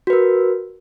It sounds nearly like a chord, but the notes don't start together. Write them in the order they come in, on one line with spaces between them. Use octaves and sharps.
F#4 B4 A#4